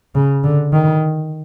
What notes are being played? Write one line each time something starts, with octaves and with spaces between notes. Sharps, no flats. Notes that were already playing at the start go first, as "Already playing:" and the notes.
C#3
D3
D#3